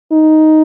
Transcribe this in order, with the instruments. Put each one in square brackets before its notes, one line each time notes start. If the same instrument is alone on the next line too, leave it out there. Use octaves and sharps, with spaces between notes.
[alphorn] D#4